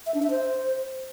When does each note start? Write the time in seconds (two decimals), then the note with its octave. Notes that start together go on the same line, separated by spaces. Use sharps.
0.06 E5
0.14 D4
0.23 E5
0.31 C5